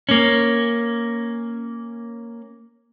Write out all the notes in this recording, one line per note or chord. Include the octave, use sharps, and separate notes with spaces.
A#3 C#4